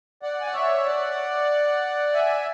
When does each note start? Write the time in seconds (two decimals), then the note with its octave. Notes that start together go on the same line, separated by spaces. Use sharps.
0.22 D5 F#5
0.40 G#5
0.47 F#5
0.54 C#5 E5
0.86 D5 F#5
2.13 E5 G#5